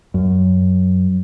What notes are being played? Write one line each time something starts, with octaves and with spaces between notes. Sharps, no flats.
F#2